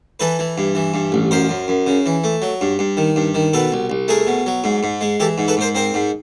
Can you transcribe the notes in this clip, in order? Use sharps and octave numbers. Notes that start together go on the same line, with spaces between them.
E3 A4 B4
E3
G2
E3
G2
A1
F#2 A#4 C5
F#2
F#2
C#3
E3
A3
F#3
G2
G2
D#3
G2
D#3
B2 A4 B4
C2
C2
A3 G#4 A#4
B2
F#3
G#2
G#2
G#3
E3 G4 A4
G#2
A4 B4
G#2 A#4 C5
C4 A#4 C5
G#2